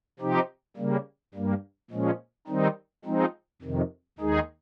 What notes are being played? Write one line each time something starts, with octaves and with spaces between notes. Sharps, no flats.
C3 F3 C4 D#4 G4
C#3 G3 A#3
G2 G3 A#3
A#2 F3 G#3 C#4
D#3 G3 C4 D#4
F3 G#3 C4 D#4
F2 C3 D#3
D#2 D#3 G#3 D#4 G#4